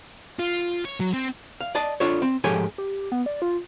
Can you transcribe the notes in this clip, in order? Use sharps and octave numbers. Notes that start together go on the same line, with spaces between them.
F4
C#5
F#3
C4
F5
D5 D#5 A5
D4 F4 A4 C#5
C4
G#2 F3 G4 A4 C#5 G#5
G4
B3
D5
F4